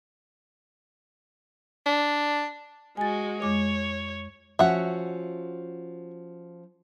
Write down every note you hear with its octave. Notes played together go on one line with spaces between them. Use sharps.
D4
G#3 F#4 G#5 A6
F2 G#3 C#5 D6
F3 C#4 F#4 E5 F#5